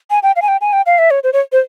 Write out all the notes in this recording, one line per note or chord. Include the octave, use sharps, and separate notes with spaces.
G#5
G5
F5
G#5
G5
G#5
G5
F5
E5
C#5
C5
C#5
C5